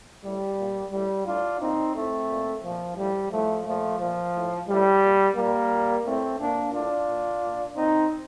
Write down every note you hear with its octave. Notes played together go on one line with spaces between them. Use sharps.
A2 G3
A#2
A2 G3
A2 D4 F4
A#2 C4 D#4
A2 A3 C4
A#2
A#2 F3
A2 G3
A2 F3 A3
A#2 F3 A3
A#2 F3
A2
A2 G3
A#2
A#2 G3 A#3
A#2
A2 A3 C4
A#2 A#3 D4
A2 D4 F4
A#2
A#2
A#2 C4 D#4